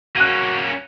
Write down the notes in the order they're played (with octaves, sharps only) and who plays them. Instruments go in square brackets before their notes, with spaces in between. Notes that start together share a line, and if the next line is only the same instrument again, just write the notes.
[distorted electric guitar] A#3 C#4 [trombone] F#4 [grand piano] F#6 D#7